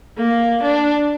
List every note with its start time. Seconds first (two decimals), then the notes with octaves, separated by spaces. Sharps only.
0.18 A#3
0.63 D4